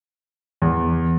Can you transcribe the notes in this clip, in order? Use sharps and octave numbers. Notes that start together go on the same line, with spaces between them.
E2